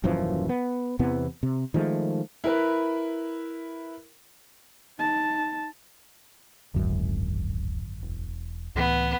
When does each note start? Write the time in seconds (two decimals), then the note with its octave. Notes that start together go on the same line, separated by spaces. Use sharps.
0.04 D#1 F#2 E3 F3
0.49 B3
0.99 E2 C3 E3 B3
1.43 C3
1.74 D#3 F3 G#3 A3
2.44 E4 A#4 B4
4.99 D#4 A5
6.74 D1 G#1 F#2 D3
8.03 E1
8.75 C#2 A2 E3 B3